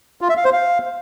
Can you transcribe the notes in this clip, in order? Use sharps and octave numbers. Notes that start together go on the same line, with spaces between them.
F4
E5
F5
C5
F5